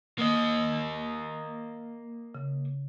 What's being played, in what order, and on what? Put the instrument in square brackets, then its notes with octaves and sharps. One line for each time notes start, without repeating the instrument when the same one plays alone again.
[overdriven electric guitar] A#3 D#5
[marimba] C#3